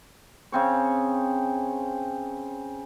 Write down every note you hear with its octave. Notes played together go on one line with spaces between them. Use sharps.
C#3 C4 C#5